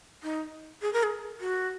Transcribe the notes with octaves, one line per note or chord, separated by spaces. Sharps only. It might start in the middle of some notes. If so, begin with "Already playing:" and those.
D#4
G#4
A#4
G#4
F#4